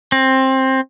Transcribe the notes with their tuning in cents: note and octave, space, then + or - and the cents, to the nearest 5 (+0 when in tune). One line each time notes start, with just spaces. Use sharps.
C4 +15